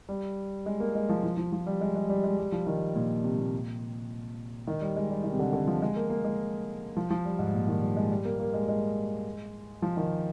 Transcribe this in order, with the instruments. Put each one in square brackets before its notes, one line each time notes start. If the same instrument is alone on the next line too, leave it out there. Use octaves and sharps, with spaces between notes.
[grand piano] G3
G#3
A#3
G#3
F3
F3
F3
F3
G3
G#3
G#3
G3
G#3
G3
F3
D#3
A#2
C3
A#2
D#3
G3
G#3
G3
D#3
C3
D3
D3
F3
G#3
A#3
A#3
G#3
F3
F3
G3
G#2
A#2
D#3
G3
G#3
G3
A#3
A#3
G#3
G#3
F3
D#3